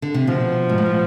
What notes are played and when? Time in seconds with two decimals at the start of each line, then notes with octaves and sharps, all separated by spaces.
0.02 D3
0.14 C3
0.27 B2 F3
0.69 G#2
0.78 A2
0.86 B2